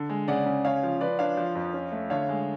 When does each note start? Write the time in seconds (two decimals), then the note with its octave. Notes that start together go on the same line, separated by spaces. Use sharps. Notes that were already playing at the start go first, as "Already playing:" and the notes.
Already playing: D3
0.10 G#3
0.28 C#3 D5 F#5
0.46 C#3
0.64 C#4 C#5 F5
0.83 F3
1.01 F3 B4 D5
1.19 D4 C#5 F5
1.37 F3
1.55 F2
1.74 C#4
1.92 A3
2.10 D3 C#5 F5
2.29 G#3